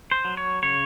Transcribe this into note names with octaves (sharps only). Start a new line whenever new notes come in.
C5
F#3
C#5
C#3 C#5